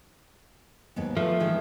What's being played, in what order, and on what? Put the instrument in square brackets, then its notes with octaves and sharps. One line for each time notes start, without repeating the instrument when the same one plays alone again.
[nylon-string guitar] D#2 G#2 B3
[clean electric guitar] F3 [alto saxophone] A3 [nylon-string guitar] B4
[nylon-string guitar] D#3 E3 G#3